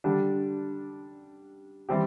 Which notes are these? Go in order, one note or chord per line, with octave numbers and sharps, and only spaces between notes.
D3 G3 D4
E3 G3 C4 G4